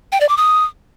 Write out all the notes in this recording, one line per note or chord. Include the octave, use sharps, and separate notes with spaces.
G5
D5
D6
D#6